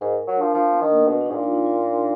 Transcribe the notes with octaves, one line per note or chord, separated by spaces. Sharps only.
G#2 A#4
F#3
D4
F3
F3 D4
B3
D#3
A#3
B2 D4
D4
D#4
G#2
A#2
F4
D#4
F4